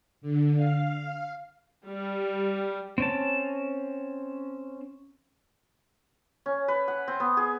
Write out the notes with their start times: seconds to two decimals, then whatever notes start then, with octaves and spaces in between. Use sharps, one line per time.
0.21 D3
0.55 F5
1.87 G3
2.98 C4 C#4 A5
6.46 C#4
6.68 B4
6.88 F#5
7.08 C4
7.20 B3
7.37 G#4